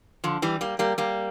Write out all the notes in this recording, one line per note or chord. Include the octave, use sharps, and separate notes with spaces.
D3 F3
E3 G3
G3 A#3
G3 A#3
G3 A#3